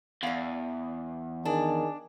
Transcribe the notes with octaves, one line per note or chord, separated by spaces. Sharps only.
E2 D5 F5
D#3 D4 G#4 D5